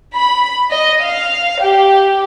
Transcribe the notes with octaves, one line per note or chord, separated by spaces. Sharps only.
B5
D#5
F5
G4